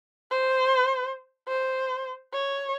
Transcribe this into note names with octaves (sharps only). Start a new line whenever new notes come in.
C5
C5
C#5